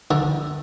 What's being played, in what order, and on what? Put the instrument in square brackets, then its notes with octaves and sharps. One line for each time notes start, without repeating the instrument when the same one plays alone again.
[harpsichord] D3